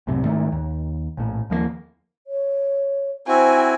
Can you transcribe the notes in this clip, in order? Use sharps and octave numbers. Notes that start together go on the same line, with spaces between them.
C2 F#2 A2 C3
G#2 D#3 A3
D#2
A#1 A2
D#2 F3 G#3 A#3
C#5
C4 E4 F#4 C5 G#5